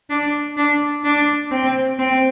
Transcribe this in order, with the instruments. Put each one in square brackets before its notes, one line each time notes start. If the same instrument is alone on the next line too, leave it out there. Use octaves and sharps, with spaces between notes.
[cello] D4
D4
D4
C4
C4